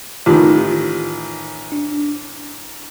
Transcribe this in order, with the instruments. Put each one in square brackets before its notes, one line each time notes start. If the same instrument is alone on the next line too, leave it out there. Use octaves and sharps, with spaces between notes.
[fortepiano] A1 D#3 [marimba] F4 G4
[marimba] D4